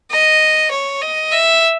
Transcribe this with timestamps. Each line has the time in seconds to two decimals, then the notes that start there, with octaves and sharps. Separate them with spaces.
0.12 D#5
0.71 C#5
1.01 D#5
1.31 E5